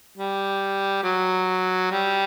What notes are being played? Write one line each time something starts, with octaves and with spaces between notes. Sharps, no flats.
G3
F#3
G3